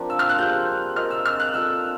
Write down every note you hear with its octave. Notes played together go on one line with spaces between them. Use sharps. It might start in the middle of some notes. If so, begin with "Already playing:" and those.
Already playing: F3 A#3 C4 D4
E6
F6
F#6
G3 C4 F4 G#4 G6
C4 F4 A#4 D#5 F6
E6
F6
F#6
A#3 D4 F4 A4 E6